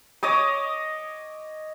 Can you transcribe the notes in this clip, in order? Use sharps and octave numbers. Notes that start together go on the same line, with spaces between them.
C#5 D#5 D6 D#6